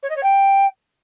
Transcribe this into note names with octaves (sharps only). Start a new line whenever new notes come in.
C#5
D#5
C#5
G5